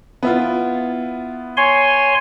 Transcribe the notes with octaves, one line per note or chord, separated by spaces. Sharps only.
B3 E4 F4
C#5 G#5 C6